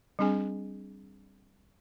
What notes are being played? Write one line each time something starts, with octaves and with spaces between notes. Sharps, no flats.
G3 C4 D4 G#4 G#5